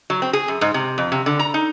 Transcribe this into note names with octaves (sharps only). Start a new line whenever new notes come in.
F#3
C4
G#4
F#2
G#2
C3
F2
C3
D3
A#5
D#4